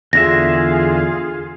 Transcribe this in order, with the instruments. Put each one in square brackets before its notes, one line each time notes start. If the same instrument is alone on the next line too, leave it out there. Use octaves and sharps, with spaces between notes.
[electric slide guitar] E2 D3 E5 [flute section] F4 G#4 [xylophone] A#6